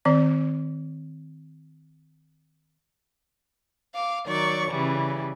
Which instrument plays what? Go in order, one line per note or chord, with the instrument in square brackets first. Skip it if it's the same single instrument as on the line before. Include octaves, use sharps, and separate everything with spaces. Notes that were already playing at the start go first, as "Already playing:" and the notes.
[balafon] D#3 C4 D5
[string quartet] F5 D6
D#3 F#3 D5 C#6
C#3 E3 G3